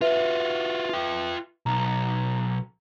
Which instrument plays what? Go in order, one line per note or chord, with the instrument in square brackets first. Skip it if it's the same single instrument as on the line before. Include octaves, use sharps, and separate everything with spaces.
[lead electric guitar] F4 F#4 [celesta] B4 E5
[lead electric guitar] F4 G5
[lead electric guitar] B1 [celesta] A#5